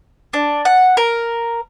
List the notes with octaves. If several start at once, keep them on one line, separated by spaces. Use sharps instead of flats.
D4
F#5
A#4